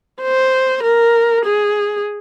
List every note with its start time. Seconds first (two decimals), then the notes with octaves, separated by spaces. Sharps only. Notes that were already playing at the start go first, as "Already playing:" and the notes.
0.22 C5
0.83 A#4
1.45 G#4